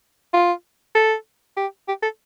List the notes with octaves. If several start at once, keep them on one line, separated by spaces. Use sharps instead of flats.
F4
A4
G4
G4
A4